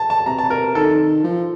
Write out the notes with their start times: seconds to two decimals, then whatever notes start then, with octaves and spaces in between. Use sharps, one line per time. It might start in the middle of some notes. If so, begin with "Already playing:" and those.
Already playing: A5
0.10 A5
0.26 C3 A#5
0.38 A5
0.50 A#4
0.75 D#3 A4
1.24 F3